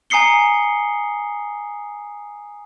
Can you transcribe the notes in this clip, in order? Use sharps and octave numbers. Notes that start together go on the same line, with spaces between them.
G#5 A#5 D#6 C7 C#7 G7